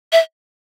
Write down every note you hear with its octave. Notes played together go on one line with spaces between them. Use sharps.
E5